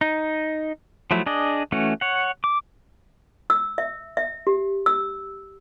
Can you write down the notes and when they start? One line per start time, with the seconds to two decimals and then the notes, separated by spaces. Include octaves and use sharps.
0.01 D#4
1.11 F3 F#3 A3 E4
1.26 D4 G#4 D5 D#5
1.72 E3 A3 C#4 F#4
2.01 C#5 F#5
2.44 D6
3.50 E6
3.78 E5
4.17 E5
4.47 G4
4.86 E6